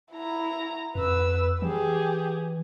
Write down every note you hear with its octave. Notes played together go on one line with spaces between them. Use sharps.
E4 A#5
F2 B4 E6
E3 G4 G#4